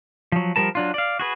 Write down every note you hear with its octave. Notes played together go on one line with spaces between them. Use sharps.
F3 F#3
F3 G3 A#4 A5
F#3 D4 F4
D5 F5
F#4 G#4 B4